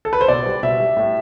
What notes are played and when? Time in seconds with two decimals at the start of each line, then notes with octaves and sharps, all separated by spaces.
0.05 A4
0.13 B4
0.21 C5
0.28 B2 D5
0.46 G3
0.63 B2 E5
0.80 G3
0.97 A2